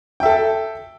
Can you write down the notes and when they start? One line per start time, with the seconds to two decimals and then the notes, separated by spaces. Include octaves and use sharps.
0.20 G5
0.23 E5
0.25 A4